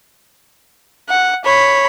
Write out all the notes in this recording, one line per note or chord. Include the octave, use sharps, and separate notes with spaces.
F#5
C#5 B5